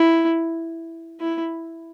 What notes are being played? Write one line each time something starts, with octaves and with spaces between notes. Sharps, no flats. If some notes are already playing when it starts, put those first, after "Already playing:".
Already playing: E4
E4